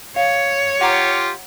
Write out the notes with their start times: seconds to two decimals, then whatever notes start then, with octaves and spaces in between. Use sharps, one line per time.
0.16 C#5 F5
0.81 F4 G4 F#5 A#5 D6